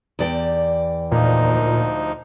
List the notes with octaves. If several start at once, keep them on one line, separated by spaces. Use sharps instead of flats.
E2 D5 G5
D2 A#2 F3 D#4